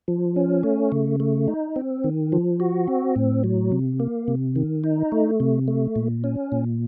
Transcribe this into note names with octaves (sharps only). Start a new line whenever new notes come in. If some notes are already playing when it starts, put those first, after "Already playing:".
F3
C#4
A3
C#3
A3
D#4
C4
D#3
F3
F#4
C4
A2
F#3
C3
A#3
C3
D#3
D#4
A3
C3
A3
A#2
C#4
A#2